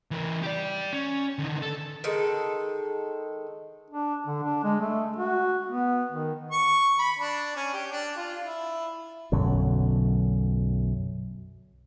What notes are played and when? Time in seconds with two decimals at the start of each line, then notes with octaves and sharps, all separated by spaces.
0.11 E3 A#4
0.43 G4 D5
0.93 C#4
1.39 D3 D#3
1.62 A4
2.04 D#3 G#3 A4
3.90 D4
4.27 D3
4.43 D4
4.64 G#3
4.80 A3
5.16 F#4
5.68 B3
6.12 D#3
6.51 C#6
6.99 B5
7.19 D4
7.56 C#4
7.74 G4
7.92 D4
8.17 F4
8.45 E4
9.32 B1 F#2 D3 F#3